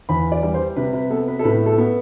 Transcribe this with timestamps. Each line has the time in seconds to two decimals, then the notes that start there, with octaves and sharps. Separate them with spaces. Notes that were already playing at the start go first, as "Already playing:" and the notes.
0.09 E2 B5
0.32 D5
0.43 G3
0.54 C5
0.76 C3 B4
0.93 B4
1.10 B3 A4
1.28 B4
1.39 A4
1.44 A2 B4
1.66 A4
1.78 B3